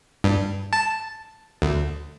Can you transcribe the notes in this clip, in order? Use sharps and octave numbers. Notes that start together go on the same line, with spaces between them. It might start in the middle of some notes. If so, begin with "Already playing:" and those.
G2
A5
D2